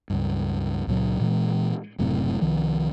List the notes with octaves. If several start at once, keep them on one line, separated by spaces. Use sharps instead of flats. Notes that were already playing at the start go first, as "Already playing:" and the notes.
C#2 G2
C#2 A#2 F#3
A#2 E3 G#3
F#1 F#2 A2 C3
C2 D#3 F3